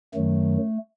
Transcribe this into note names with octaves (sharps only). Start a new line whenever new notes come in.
F#2 D#3 F#3 A3